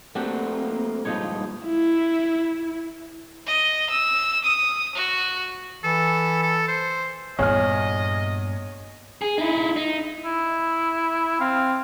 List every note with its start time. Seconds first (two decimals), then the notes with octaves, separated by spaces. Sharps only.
0.15 A3 A#3 C4 D4 F#4 G4
1.05 G2 A#2 F3 G#3 D#4 C#5
1.65 E4
3.47 D#5
3.91 E6
4.45 D#6
4.96 F#4
5.84 E3 A4
6.42 A4
6.68 C5
7.39 E2 G2 A#2 C#5 D#5 G#5 F6
9.22 G#4
9.38 D#4 E4
9.76 D#4
10.25 E4
11.41 C4 F5